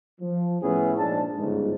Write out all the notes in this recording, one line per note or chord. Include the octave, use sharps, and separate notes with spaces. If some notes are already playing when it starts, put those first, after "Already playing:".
F3
A2 B3 C#4 E4 G#4
A#1 G#2 D4 A5
G1 C#2 G#2